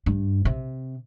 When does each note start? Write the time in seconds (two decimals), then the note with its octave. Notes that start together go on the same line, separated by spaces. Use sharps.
0.06 G2
0.45 C3